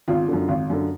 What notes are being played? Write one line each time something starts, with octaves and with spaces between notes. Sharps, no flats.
G#1 F4
F#2 D3
G#1
F#2 D3